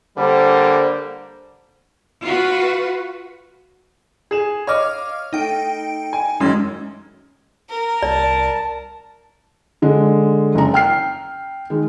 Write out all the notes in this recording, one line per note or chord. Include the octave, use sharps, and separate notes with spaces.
D3 G3 A#3 C5
F4 F#4 B4
G#4 E7
C#5 D#5 F5 D6 F6
A3 D#4 G5 D7
G#5
F#2 D#3 G#3 C6
A#4
C2 D5 A5
D3 G#3
F#1 A#5
G5 F6 C7
D#3 G#3